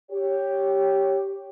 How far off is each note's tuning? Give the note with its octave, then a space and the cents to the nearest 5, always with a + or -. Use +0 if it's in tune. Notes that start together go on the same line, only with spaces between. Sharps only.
G4 +0 C#5 +0